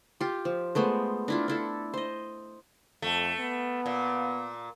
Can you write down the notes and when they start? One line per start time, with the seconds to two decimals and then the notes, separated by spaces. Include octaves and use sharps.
0.20 F4 G4
0.45 F3
0.75 G#3 A3 B3 C5
1.28 D4 E4 F4
1.48 D4 E4 A4
1.94 C5 D#5
3.02 F2 A3
3.40 B3
3.86 A#2